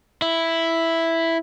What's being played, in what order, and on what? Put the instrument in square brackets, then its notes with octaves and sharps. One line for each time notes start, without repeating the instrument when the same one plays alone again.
[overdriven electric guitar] E4